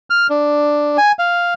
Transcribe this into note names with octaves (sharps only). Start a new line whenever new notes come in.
F6
D4
G#5
F5